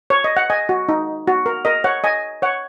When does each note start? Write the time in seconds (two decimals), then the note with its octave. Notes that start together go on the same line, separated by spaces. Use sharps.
0.10 C#5
0.24 D#5
0.37 F#5
0.50 D#5 G#5
0.69 F#4
0.89 D#4
1.27 F#4
1.46 A#4
1.65 A#4 D#5
1.84 C#5 F#5
2.04 D#5 G#5
2.42 C#5 F#5